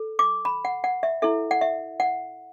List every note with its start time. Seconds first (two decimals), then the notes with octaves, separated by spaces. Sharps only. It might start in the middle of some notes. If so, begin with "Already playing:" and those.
Already playing: A4
0.19 D6
0.45 B5
0.65 F#5
0.84 F#5
1.03 E5
1.22 E4 A4 E5
1.51 F#5
1.61 E5
2.00 F#5